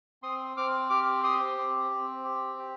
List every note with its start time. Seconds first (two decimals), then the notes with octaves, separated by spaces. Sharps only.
0.23 C4 C6 D#6
0.57 C4 D6 F6
0.90 G4 D6 F6
1.23 G4 C6 D#6
1.57 C4
1.91 C4
2.24 G4
2.59 G4